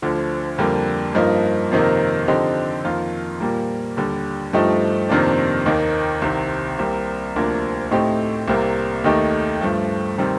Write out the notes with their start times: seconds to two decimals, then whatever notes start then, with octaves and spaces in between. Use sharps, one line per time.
0.02 D2 D3 F3
0.58 F2 D3 G3 A#3
1.15 G2 F3 A#3 D#4
1.71 F2 C3 D#3 A#3 D#4
2.28 D3 F3 C4 D#4 G4
2.84 F2 D#3 A#3 F4
3.40 A#2 G3 A#3
3.97 D#2 D3 G3
4.53 G2 F3 A3 D#4 G4
5.09 F2 C3 D#3 A#3 D4
5.66 D#2 D#3 A#3 D#4
6.22 C2 C3 D#3
6.79 C2 C3 G3 A#3
7.36 D2 C3 F3 A#3 D4
7.91 A2 A3 C4 D#4 G4
8.48 C2 C3 G3 A#3
9.04 D#2 D#3 A3 D#4 G4
9.61 G2 F3 A3
10.18 C3 D#3 G3 C4